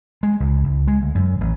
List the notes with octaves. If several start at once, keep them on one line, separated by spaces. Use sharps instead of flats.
G#3
C#2
C#2
G#3
D2
F#2
A1